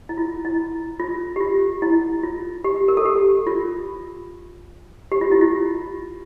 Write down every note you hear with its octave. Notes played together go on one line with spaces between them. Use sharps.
E4
F4
E4
F4
G4
F4
E4
F4
G4
A#4
A4
G4
F4
G4
F4
E4
F4